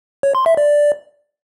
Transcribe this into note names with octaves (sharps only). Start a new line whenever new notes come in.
C#5
C6
E5
D5